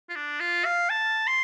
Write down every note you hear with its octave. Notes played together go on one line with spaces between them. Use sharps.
F4
D4
F4
F5
A5
C6